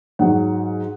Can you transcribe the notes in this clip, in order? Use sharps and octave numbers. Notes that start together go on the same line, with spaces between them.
G#2 F#3 F#5